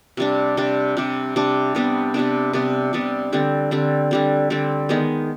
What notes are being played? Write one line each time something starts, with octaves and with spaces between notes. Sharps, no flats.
C3 G3 D4
C3 G3 D4
C3 G3 D4
C3 G3 D4
C3 G3 B3 D4
C3 G3 B3 D4
C3 G3 B3 D4
C3 G3 B3 D4
D3 G3 C4
D3 G3 C4
D3 G3 C4
D3 G3 C4
D#3 G#3 B3